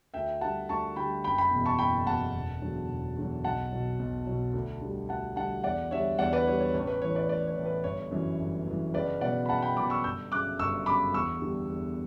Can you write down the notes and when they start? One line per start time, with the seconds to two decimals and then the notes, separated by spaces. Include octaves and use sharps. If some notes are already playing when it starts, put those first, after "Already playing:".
0.14 D2 E5 G5
0.41 D3 G3 F#5 A5
0.69 D2 A5 C#6
0.96 D3 G3 G5 B5
1.24 F#1 G5 B5
1.38 G5 B5
1.51 E2 B2
1.66 A5 C#6
1.79 F#1 G5 B5
2.06 E2 B2 F#5 A5
2.34 E1
2.62 E2 D3 F#3
2.89 E1
3.17 E2 D3 F#3
3.44 B1 F#5 A5
3.72 B2 F#3
3.99 B1
4.27 B2 F#3
4.54 D2
4.82 D3 G3
5.09 D2 F#5 A5
5.36 D3 G3 F#5 A5
5.64 E2 D5 F#5
5.91 D3 G3 C#5 E5
6.19 E2 D5 F#5
6.33 B4 D5
6.46 D3 G3 C#5
6.60 C#5
6.74 A1 C#5
6.87 B4
7.02 A2 E3 C#5
7.15 B4 D5
7.29 A1 B4 D5
7.47 C#5
7.57 A2 E3
7.66 B4
7.84 G1 C#5
8.11 F#2 E3
8.39 G1
8.67 F#2 E3
8.94 C#2 B4 D5
9.21 B2 F#3 D5 F#5
9.46 B5
9.49 C#2 F#5 A5
9.62 G5 B5
9.77 B2 F#3 B5 D6
9.90 C#6 E6
10.04 G1 E6 G6
10.32 F#2 C#3 D6 F#6
10.59 G1 C#6 E6
10.86 F#2 C#3 B5 D6
11.14 E2 C#6 E6
11.42 D3 G3
11.70 E2